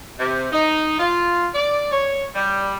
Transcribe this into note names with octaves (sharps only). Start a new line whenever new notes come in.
C3
D#4
F4
D5
C#5
G3